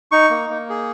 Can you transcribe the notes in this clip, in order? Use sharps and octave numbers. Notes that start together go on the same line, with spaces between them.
D#4 C#6
A#3
A#3
G#4